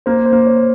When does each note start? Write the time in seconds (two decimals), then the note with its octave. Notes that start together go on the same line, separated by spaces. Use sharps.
0.06 A#3 C5
0.26 C5
0.32 A#3
0.47 C#5